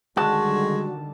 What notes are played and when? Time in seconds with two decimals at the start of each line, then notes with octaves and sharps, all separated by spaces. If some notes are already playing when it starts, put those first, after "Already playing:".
0.17 D3 D#3 G3 G#3 F#4 A5